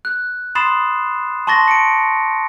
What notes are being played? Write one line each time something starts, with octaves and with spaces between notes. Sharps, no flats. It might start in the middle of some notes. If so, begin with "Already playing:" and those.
F#6
B5 C6 D#6 A6 C7 E7
A5 C6 C#6 A6 A#6
C#7 D7